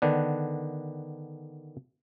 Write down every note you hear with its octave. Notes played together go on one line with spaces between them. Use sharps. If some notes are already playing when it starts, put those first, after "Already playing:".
D3 D#3 B3 D4